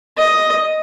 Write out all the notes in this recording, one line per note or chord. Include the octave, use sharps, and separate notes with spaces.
D#5